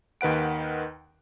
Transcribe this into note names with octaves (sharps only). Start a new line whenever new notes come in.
D#2 D#3 B4 F#5 D7